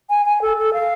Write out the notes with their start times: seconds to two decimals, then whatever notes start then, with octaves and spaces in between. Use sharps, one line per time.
0.10 G#5
0.26 G#5
0.42 A4
0.57 A4
0.73 F5